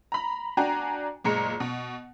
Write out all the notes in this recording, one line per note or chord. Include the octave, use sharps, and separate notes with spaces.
A#5 B5
D4 F#4 G5 G#5 A#5
F#1 A#2 G#3 A#5 C#7
B2